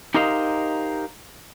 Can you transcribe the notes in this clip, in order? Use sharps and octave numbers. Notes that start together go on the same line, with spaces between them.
D#4 G4 A#4 C5 D#5 F5